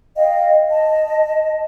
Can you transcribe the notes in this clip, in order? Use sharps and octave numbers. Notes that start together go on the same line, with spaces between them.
D#5 F5 G5
D#5 A5